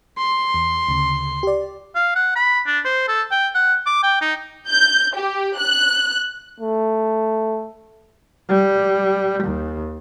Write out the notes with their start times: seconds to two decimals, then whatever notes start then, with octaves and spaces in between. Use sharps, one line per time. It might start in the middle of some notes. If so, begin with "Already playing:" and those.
0.18 C6
0.54 E2
0.88 D2 C#3
1.43 G4 D5
1.95 F5
2.15 F#5
2.35 B5
2.66 D4
2.85 C5
3.08 A4
3.31 G5
3.54 F#5
3.86 D6
4.03 G5
4.21 D#4
4.71 G6
5.17 G4
5.57 F#6
6.60 A3
8.50 G3
9.44 D#2